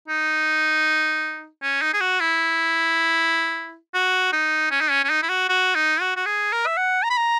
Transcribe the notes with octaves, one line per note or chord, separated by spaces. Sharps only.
D#4
C#4
D#4
G#4
F#4
E4
F#4
D#4
C#4
D#4
C#4
C#4
D#4
E4
F#4
F#4
D#4
F#4
F#4
G#4
A#4
E5
F#5
A#5
B5
A#5